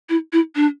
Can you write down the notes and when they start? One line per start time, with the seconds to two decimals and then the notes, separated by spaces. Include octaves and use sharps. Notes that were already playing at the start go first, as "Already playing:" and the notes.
0.09 E4
0.33 E4
0.55 D4